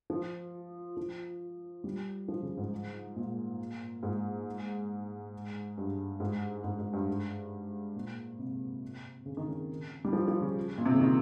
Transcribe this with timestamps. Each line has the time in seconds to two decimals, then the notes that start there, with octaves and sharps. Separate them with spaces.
0.10 F3
0.97 F3
1.84 G3
2.28 F3
2.43 C#3
2.57 G#2
3.16 A#2
4.03 G#2
5.78 G2
6.20 G#2
6.64 G#2
6.79 G#2
6.93 G2
7.07 G#2
7.96 A#2
8.39 C3
9.26 C#3
9.37 D#3
9.48 C#3
10.05 G3
10.13 F3
10.28 F3
10.42 C#3
10.78 A#2
10.85 C3
10.94 C#3
11.00 D#3